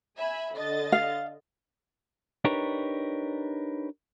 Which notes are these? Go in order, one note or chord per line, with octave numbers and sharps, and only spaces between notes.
E5 G#5 B5
D3 D#5 A6
F5
D4 D#4 G4 A#4 B4 C#5